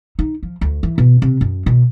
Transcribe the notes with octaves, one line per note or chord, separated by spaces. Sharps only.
D#4
F3
D2
E3
B2
C3
F#2
B2